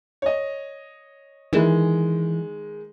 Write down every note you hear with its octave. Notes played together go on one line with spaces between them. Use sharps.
C#5 D#5
D#3 E3 G#3